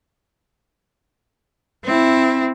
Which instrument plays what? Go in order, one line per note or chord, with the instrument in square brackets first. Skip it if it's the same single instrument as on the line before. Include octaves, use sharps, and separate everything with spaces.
[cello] C4 E4